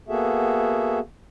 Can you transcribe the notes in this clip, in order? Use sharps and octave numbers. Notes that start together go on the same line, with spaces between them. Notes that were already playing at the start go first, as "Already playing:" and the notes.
A#3 B3 F#4 G#4 A4 E5